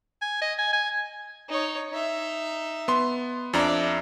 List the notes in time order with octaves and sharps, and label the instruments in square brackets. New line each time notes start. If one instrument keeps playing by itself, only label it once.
[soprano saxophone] G#5
D#5
G#5
G#5
[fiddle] D#4 C#5
D#4 E5
[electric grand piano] B3 C6
[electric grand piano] F2 D4 A#5 [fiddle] D5 E5